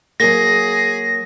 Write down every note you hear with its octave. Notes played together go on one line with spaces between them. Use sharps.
F#3 A#3 G#4 A#6